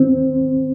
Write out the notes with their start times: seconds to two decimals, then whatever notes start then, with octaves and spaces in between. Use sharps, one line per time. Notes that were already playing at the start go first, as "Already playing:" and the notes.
Already playing: D#3 C4
0.08 D#2